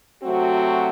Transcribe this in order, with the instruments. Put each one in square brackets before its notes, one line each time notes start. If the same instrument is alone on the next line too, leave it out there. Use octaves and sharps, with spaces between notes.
[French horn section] C3 F#3 A3 C4 F#4